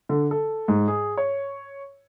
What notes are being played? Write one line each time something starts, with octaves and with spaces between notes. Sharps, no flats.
D3
A4
G#2
G#4
C#5